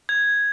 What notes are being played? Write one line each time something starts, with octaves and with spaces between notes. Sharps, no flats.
G#6